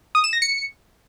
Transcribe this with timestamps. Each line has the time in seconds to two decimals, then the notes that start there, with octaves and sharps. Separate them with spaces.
0.15 D#6
0.24 E7
0.33 A#6
0.42 C#7